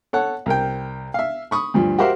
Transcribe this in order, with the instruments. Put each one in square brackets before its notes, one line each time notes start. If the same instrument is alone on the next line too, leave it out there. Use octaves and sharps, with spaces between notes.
[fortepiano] A4 C#5 F#5
C2 A#4 G5
E5 F5
B5 C#6 D#6
D2 G2 F3
F#4 G4 A#4 C5 E5 F5